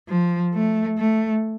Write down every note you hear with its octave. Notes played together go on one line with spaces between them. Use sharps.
F3
A3
A3